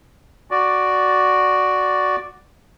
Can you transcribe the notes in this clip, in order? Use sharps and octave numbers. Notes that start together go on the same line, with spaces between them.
F#4 D5